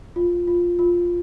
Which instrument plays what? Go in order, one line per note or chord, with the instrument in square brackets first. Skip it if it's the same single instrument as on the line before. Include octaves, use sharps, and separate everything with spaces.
[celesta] F4
F4
F4